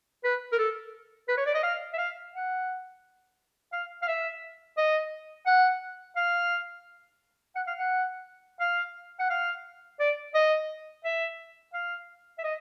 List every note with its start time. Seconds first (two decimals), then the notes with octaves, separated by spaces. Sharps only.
0.24 B4
0.52 A#4
0.59 A4
1.28 B4
1.37 C#5
1.46 D5
1.54 D#5
1.63 F5
1.94 E5
1.98 F5
2.34 F#5
3.72 F5
4.02 F5
4.07 E5
4.77 D#5
5.46 F#5
6.16 F5
7.56 F#5
7.67 F5
7.79 F#5
8.60 F5
9.19 F#5
9.30 F5
9.99 D5
10.35 D#5
11.05 E5
11.73 F5
12.38 E5
12.44 D#5